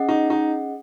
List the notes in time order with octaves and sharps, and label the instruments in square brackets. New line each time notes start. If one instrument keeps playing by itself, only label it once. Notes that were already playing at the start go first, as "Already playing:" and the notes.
Already playing: [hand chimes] C#4 G#4 D#5 F#5
[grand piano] D#4
D#4